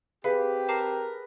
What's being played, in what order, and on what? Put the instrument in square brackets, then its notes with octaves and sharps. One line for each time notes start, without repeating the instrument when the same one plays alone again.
[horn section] C4 G4 [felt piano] G#4 B4 [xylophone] F5 D#7
[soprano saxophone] A#4 [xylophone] A5 D6 C7